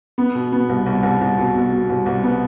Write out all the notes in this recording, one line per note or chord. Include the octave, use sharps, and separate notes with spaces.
B3
B2
B3
C2
C2
C2
C2
B2
B2
B2
C2
C2
B3